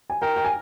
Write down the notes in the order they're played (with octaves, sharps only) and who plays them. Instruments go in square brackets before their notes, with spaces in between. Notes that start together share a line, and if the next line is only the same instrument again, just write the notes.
[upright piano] G#5
[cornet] A#4 [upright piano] G5
[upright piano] G5
G#5